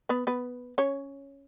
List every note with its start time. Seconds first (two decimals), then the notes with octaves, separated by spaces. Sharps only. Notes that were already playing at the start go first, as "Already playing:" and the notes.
0.09 B3 B4
0.27 B3 B4
0.78 C#4 C#5